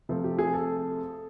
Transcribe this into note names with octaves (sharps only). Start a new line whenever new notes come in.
C3 F3 A3 C4
G4
G#4
A4